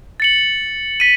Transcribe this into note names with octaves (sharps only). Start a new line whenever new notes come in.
A6 C#7 F#7
B6 D#7